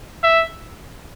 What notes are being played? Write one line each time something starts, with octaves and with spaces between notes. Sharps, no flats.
E5